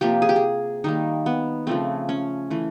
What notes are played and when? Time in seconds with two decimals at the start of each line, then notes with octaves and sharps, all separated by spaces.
0.01 C3 F3 A#3 G4
0.22 G#4
0.29 G4
0.36 G#4
0.84 D#3 G3 A#3 D#4
1.26 B3
1.67 C#3 F3 A3 C4
2.09 C#4
2.50 E3 A3